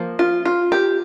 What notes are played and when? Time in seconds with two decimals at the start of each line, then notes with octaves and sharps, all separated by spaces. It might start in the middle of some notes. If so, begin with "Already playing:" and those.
Already playing: F3 A#3
0.19 F4
0.45 F4
0.72 G4